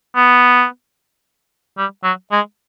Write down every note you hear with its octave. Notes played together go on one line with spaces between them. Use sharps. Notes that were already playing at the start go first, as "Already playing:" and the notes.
B3
G3
F#3
G#3